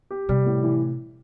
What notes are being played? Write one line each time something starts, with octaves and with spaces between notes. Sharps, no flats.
G4
C3 G3
A2
E3